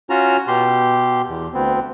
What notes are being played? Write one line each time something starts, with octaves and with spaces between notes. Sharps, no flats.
C#4 F4 F#4 A#5
B2 G4 C6
E2
D2 B3 C4